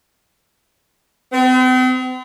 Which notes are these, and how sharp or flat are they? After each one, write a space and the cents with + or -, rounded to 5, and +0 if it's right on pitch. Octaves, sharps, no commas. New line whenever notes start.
C4 -45